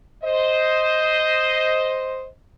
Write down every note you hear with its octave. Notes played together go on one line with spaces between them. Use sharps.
C5 D#5